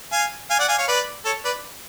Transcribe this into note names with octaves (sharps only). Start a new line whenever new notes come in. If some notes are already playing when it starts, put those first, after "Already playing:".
F5 G#5
F5 G#5
D5 F#5
F5 G#5
C#5 F5
B4 D5
A4 C#5
B4 D5